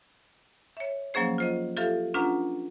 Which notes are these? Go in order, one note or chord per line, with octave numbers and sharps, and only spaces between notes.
C#5 E5
F3 F#3 A#3 C#4 G#4 C5
F4 C5 D#5
F4 G4 A4 E5 F5
C#4 D4 F4 B4 F#5 A#5